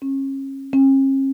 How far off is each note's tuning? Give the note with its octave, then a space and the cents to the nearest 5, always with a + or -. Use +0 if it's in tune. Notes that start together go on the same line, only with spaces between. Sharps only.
C#4 -35
C#4 -45